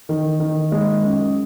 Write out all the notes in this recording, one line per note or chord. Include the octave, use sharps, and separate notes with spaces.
D#3
D#3
G#3
F#2